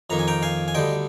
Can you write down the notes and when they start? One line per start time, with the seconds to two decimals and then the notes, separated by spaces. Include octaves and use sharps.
0.10 F2 D#3 A#3 A#5
0.19 G#5
0.28 G5 A#5
0.43 F5 G#5
0.68 G#5
0.75 D2 D3 G3 D#5 G5